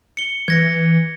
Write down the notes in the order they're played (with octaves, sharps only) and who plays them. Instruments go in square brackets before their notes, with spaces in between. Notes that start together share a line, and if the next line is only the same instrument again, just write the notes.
[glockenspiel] C#7 G7
[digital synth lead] E3 [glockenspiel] G#6 A#6 C#7